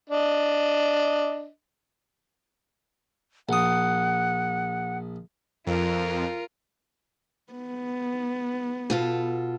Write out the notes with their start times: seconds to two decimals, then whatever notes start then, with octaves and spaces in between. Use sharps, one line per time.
0.10 D4 D#5
3.49 A#1 F#5 D#6
5.66 F2 F4 A#4
7.53 B3
8.90 B2 F4 A4